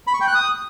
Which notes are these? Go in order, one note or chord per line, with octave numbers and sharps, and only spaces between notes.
B5
C#6
G5
F#6
D#6